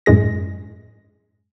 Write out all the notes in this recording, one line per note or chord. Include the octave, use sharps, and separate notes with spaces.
F#2 A2 G#3 G#4 A#6